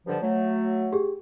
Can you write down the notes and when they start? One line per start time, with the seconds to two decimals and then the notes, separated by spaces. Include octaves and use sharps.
0.07 G2 D3 F3
0.22 F#3 A3
0.93 G4 G#4